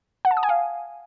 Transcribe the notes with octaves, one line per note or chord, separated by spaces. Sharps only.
F#5
A5
D#6
G#5
F5